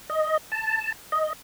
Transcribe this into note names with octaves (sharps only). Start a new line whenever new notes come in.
D#5
A5
D#5